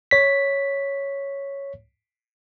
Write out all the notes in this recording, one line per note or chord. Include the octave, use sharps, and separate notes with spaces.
C#5 B6